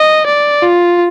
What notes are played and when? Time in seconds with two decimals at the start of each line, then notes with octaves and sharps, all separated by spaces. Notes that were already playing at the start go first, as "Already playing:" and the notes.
Already playing: D#5
0.27 D5
0.63 F4